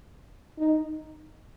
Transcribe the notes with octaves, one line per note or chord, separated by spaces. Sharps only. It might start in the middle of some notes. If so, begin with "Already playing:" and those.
D#4